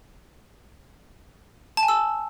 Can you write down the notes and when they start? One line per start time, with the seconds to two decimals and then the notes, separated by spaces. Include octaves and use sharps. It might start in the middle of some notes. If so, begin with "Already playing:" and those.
1.77 A5
1.83 G#5
1.88 E6